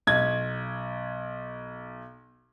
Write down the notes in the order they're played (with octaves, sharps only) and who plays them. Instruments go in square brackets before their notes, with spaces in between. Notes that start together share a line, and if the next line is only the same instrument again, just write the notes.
[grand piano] B1 G#6